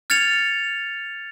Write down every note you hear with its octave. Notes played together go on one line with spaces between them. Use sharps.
F6 G#6 A6 C#7 F7